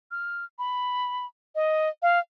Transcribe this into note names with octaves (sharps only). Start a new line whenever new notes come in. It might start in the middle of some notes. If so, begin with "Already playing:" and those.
F6
B5
D#5
F5